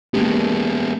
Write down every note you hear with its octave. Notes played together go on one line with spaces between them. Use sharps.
G#3 A#3 B3 C#4 G4